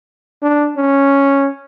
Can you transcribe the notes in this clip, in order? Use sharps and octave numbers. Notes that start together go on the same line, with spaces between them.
D4
C#4